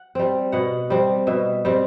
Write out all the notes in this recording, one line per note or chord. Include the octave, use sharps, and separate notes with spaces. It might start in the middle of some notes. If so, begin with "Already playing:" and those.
Already playing: F#5
G3 C4
B2 F#5
G3 C4
B2 E5
G3 C4